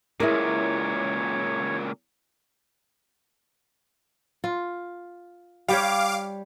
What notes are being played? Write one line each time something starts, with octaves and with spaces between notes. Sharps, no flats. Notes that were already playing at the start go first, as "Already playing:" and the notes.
C#2 A#2 E4 G#4 A#4 C#5
F4
G3 G4 C#5 F5 D6